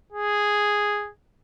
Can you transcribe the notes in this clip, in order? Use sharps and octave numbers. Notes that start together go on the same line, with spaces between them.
G#4